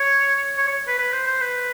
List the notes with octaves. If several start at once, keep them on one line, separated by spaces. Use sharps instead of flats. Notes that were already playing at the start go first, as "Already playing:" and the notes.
Already playing: C#5
C#5
C#5
B4
B4
C5
C5
B4